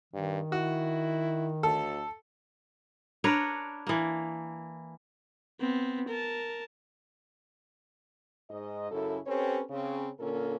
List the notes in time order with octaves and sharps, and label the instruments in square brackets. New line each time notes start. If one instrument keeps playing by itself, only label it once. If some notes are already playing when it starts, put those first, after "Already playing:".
[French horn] G2 [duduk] D#3
[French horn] E4 [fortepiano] F#4
[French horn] D2 [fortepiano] A4
[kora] D4 A#4 B4 C#5
E3 A#3
[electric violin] B3 C4
A#4 A5
[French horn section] G#2 D#5
F#2 C#3 C#4 E4 A4
C4 C#4 G4 A4 B4 C#5
C#3 C4 C#4
A#2 D3 A#3 C#4 A4 A#4